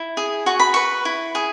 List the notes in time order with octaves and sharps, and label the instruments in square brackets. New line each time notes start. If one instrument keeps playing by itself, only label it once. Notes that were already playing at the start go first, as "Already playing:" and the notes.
Already playing: [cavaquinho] E4
G#4
F#4 C#6
B5
B4 C#6
E4
G#4